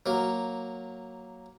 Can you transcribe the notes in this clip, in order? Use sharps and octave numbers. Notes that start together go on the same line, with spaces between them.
F#3 A#3